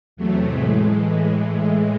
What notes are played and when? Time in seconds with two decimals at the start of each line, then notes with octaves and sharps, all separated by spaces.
0.17 E2 C3 F#3 A3
0.44 A2 E3 G#3